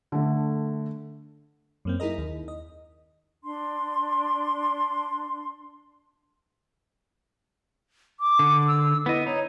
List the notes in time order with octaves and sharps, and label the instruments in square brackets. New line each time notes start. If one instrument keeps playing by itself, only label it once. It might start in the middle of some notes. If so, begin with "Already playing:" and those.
[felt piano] D3 A3
[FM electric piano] F#2 A#3 C4
D#4 E4 G#4 A#4 D#5
D#2
D#5
[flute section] D4 C6
[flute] D6
[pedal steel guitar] D3
[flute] E6
[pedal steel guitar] B3 D#5 [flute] E4
[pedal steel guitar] D#4 [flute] C#5